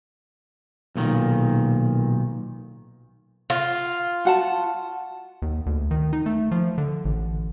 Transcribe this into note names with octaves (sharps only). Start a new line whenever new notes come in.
B1 A#2 D#3
F4
F#4 F#5 A5
D#2
D2
D#3
D#4
A3
F3
D3
A1